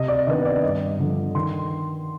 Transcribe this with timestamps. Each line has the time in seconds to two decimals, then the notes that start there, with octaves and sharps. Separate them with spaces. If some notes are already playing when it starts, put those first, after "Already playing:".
Already playing: C3 D#5
0.08 D5
0.27 D#3 B3 D4 D#5
0.45 D5
0.62 G2 D#5
0.99 D3 F3
1.35 D#3 C6